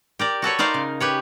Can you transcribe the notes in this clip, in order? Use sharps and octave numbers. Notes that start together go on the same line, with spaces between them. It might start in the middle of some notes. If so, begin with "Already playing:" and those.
G4 A#4 D5
F#4 A4 B4 C#5
D#4 A#4 C5 D5 F5
C#3
G4 B4 C#5